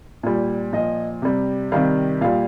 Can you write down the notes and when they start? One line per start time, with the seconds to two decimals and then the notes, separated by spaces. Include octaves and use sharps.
0.23 A#2 G3
0.73 A#2 F3 D#5
1.22 C3 G3
1.72 C3 D#3 G3 F5
2.21 A#2 G3 F5